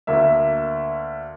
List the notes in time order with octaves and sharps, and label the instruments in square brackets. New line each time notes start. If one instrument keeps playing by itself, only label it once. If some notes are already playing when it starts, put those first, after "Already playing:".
[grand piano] D2 A#3 E5